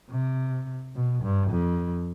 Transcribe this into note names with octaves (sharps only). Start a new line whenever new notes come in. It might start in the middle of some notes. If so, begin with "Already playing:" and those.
C3
B2
G2
F2